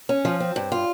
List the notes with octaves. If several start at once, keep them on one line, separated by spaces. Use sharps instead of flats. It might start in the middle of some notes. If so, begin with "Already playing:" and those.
C#4
F3
C4
G2
F4